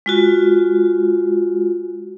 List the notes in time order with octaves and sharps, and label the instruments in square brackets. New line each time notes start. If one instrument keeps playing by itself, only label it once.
[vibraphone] G#3 F4 F#4